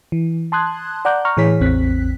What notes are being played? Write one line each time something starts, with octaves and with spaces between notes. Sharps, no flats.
E3
A5 C6 D#6 F#6 G#6
D5 F#5 A#5 D6 F#6 G6
A#5 C#6 F6
A2 E3 G#4 C#5 B6
A1 E2 C4 F#6 B6